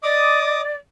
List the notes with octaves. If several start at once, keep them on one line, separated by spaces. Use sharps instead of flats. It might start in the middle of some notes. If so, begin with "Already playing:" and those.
D5 D#5 D6 D#6